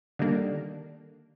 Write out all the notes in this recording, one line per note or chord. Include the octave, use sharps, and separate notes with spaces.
D3 D#3 G3 A#3 D4